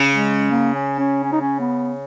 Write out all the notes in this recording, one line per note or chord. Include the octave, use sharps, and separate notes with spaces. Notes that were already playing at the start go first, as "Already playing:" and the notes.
Already playing: C#3
G#3
A#3
C#4
C#4
C#4
D#4
C#4
B3